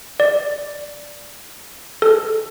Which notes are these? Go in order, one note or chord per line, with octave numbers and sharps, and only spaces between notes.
D5
A4